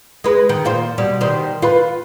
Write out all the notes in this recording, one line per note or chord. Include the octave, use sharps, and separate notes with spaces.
G#3 B4
D#3
A#2 F4 C5
B2 G3
D#3 G3 C5
F4 B4